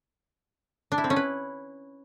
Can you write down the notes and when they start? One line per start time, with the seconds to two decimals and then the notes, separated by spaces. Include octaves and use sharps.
0.92 D4
0.98 E4
1.04 C4
1.10 C#4
1.16 B4